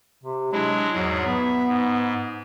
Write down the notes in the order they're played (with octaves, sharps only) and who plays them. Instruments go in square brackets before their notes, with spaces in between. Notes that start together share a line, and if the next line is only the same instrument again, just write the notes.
[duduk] C3
[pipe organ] F#3 D4 E4 [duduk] G#3
[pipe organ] E2 G#2 G#4 [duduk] F#3
[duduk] B3 [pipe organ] E5
[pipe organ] G#2